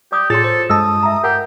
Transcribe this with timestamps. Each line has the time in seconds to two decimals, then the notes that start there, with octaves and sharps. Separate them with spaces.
0.12 G4 D5 D6 D#6
0.30 A2 F4 G#4 A4 C#5 C6 A6
0.44 C5
0.70 G2 G#3 A4 D#5 A5 D#6 E6
1.03 E5 A#5
1.24 G4 A#4 F#5 G#5